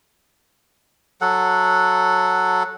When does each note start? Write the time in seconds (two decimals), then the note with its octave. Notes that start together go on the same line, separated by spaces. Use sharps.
1.21 F#3 A4 F#5